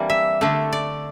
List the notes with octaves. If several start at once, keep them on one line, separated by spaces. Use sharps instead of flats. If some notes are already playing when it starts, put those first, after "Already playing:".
Already playing: E3 G3 A#3 C4 D4
E5
D3 A3 D4
D5